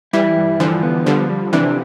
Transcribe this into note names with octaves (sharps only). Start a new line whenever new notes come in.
E3 G3 E4
G2
D3 E3 F3
B3
D3 F3 G3
G3
C3 E3 D4